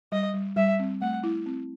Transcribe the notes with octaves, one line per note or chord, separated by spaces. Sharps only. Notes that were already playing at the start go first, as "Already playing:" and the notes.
G3 D#5
G3
G3 E5
C4
A3 F#5
E4
C4